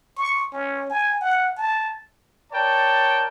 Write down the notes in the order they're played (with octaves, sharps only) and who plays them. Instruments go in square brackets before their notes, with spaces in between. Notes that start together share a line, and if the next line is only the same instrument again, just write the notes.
[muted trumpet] C#6
C#4
G#5
F#5
A5
[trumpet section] A#4 C#5 D5 G5 A5